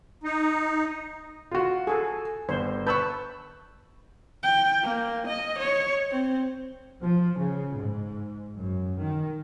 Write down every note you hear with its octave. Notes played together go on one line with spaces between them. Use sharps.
D#4
F4 F#4
G#4 A4
G1 C5
B4 A5 B5 C#6 E6 G6
G5
A#3
D#5
C#5
C4
F3
C#3
G#2
F#2
D#3